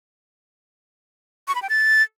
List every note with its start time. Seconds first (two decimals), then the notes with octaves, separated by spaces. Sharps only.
1.48 C#6
1.55 B5
1.62 G5
1.69 A6